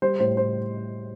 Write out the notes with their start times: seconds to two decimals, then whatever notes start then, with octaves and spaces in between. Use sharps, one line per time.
0.02 G3 C5
0.20 A2 C5
0.37 A2 C5